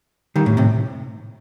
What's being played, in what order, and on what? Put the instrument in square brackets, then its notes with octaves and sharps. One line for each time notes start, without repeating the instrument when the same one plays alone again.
[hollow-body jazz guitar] D#3 G3
A2
A2 C3